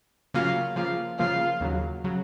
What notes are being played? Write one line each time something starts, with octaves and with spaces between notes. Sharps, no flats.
C#3 F#3 A#3 C#4 F4
C#3 F3 A#3 F4
C#3 F3 A#3 F4
D#2 C#3 F#3
C#3 F#3